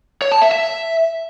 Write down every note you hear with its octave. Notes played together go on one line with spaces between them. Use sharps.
C#5
A5
E5
E5